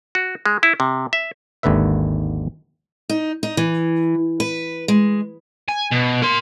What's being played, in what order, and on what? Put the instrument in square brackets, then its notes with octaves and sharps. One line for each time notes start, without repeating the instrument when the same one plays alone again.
[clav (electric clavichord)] F#4
G#3
E4
C3
E5
G#1 D#2 D3 B4 E5
[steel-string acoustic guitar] D#4
D#4
E3
B4
G#3
[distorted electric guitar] G#5
B2
A#4 C6